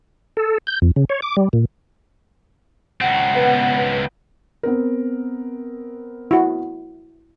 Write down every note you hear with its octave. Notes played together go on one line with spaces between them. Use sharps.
A4
G6
F2
C#3
C#5
D6
G3
A#2
C#2 C4 F#5
B3
B3 C4 A#4
E4 F#4